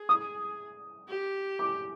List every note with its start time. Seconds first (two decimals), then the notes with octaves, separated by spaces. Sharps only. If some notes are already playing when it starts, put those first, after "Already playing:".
Already playing: G#4
0.09 D#6
1.08 G4
1.59 D6